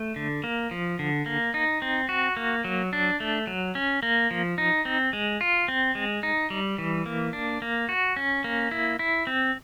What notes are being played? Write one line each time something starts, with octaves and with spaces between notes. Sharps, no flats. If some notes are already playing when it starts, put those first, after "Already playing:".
Already playing: A3
D3
A#3
F3
D3
A#3
D#4
C4
F#4
A#3
F#3
D4
A3
F#3
C#4
A#3
F3
D#4
C4
G#3
F4
C4
G#3
D#4
G3
E3
A#3
D4
A#3
F#4
C#4
A#3
E4
E4
C4